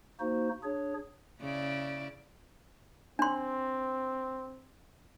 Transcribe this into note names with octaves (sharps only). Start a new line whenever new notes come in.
A#3 D#4 F#4 C5
D4 G#4 C#5
C#3 E4 D5
C4 D4 C6